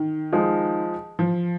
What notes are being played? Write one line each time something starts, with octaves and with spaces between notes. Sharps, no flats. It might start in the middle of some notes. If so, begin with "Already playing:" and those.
Already playing: D#3
F3 G#3 D#4
F3